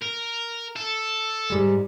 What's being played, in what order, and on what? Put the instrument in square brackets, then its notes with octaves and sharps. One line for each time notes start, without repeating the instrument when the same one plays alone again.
[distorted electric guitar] A#4
A4
[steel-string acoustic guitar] G#2 G3 G#3